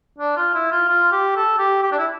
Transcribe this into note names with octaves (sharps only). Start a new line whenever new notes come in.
D4
F4
E4
F4
F4
G4
A4
G4
G4
D4
E4